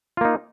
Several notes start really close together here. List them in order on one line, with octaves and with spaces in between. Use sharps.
F4 A#3 D#4